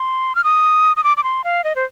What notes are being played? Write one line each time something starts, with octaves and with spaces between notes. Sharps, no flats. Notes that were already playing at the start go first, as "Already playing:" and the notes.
Already playing: C6
F6
D#6
D#6
D6
D6
C6
F5
D#5
C5